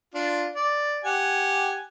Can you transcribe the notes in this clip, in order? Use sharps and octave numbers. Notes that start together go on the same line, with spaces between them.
D4 F4
D5
G4 F#5 G#5